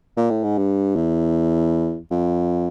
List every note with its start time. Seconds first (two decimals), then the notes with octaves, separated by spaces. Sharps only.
0.17 A#2
0.30 A2
0.43 G#2
0.58 G2
0.96 E2
2.10 F2